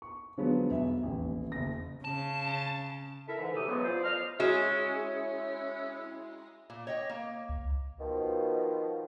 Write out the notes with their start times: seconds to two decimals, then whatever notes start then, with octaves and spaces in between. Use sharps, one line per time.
0.02 C#6
0.37 D3 F3 F#3 G#3 B3
0.71 B1 E5
1.03 D#1 A1
1.52 F#1 A#6
2.05 C#3 A5
3.27 E4 A4 A#4 E5
3.39 G#2 D3 E3
3.54 D2 A2 C3 G4 A4 D#6
3.67 C#3 E3 F#3 G#3 B3
3.83 F4 C5 D5
4.02 A2 F3 D#5 F5 F6
4.40 G#3 C#4 E4 F#4 E7
6.70 A#2
6.87 C#5 D#5 G5
7.10 A#3
7.49 C#2
7.99 B2 D#3 F3